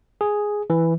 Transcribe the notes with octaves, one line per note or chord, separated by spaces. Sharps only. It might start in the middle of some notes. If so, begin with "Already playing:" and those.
G#4
E3